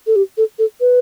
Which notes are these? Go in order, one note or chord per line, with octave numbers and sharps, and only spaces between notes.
A4
G4
A4
A4
B4